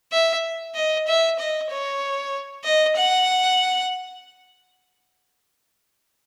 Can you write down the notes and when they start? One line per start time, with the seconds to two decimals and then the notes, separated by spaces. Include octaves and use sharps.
0.12 E5
0.75 D#5
1.07 E5
1.39 D#5
1.70 C#5
2.64 D#5
2.96 F#5